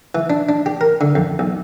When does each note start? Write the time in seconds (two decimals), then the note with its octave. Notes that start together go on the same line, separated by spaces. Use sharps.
0.15 E3
0.30 D4
0.49 D4
0.66 G4
0.81 A#4
1.01 D3
1.15 F2
1.39 B1